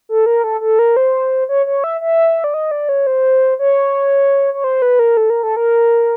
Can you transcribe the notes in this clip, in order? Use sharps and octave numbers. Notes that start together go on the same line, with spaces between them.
A4
A#4
A4
A4
A#4
C5
C#5
C#5
E5
E5
D5
D#5
D5
C#5
C5
C#5
C#5
C5
B4
A#4
A4
A#4
A4
A#4